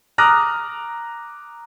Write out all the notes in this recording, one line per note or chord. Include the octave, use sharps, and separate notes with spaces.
A#5 D6 D#6 F6 F#6 A#6